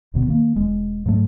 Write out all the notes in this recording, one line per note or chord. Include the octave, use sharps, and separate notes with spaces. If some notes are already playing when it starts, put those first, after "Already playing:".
E1 D2 B2 B3
D#3 A#3
E1 G#3
G#2 F#3 A3